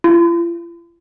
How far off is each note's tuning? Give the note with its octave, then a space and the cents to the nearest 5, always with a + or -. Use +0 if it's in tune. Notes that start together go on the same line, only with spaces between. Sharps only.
F4 -45